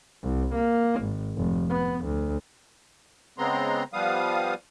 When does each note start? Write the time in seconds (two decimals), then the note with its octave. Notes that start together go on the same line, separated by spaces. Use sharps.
0.23 C2
0.55 A#3
1.01 G#1
1.36 F1
1.70 B3
2.05 D2
3.38 C#3 G#3 B3 C4 A#5 C6
3.93 F3 G3 B3 F5 D#6